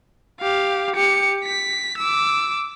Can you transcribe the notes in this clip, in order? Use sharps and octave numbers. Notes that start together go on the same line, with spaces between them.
G4 F5
G4 C#7
B6
D6 E6